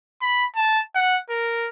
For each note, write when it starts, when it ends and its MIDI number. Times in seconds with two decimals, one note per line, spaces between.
0.21 0.43 83
0.56 0.81 81
0.95 1.18 78
1.30 1.69 70